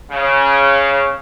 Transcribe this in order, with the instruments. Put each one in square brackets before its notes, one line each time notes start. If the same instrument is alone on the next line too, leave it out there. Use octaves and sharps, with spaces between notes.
[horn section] C#3